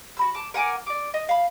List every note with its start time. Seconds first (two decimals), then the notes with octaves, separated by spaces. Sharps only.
0.17 F#4 B5 E6
0.34 A5 D6
0.54 A#4 F#5 G#5 D6
0.86 D5 D6
1.14 D#5
1.29 F5 B5